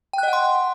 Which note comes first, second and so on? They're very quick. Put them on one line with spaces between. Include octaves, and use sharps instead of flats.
G5 F#6 D#5 F#5 C6